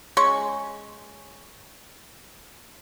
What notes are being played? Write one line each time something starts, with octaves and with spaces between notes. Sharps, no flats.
G#3 C#4 C#6